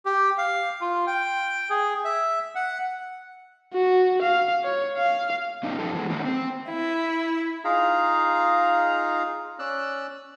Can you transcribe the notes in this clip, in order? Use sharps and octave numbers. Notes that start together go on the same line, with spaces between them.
G4
F5
F4
G5
G#4
E5
F#5
F#4
F5
C#5
F5
G2 C#4 D#4
G2 F3 D#4 A4
E3 G#3
D#3 A3 A#3 C#4 D#4
C4
E4
D#4 F4 G#4 F5 A#5
C#4 D5 E6 F#6